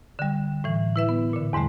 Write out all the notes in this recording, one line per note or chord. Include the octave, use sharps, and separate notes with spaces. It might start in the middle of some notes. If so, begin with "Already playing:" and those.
D3 G3
A2 E3
E4 B4 E5
B3
A#2 D3
E2 G#2 D3 G3 A3